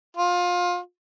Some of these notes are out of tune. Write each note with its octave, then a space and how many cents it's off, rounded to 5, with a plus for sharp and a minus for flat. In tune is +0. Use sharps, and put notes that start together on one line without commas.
F4 +25